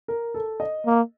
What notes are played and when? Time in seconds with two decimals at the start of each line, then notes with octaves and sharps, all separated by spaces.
0.08 A#4
0.34 A4
0.60 D#5
0.86 A#3